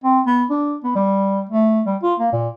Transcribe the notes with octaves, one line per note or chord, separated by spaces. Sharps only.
C4
B3
D4
B3
G3
A3
G3
F4
A#3
A#2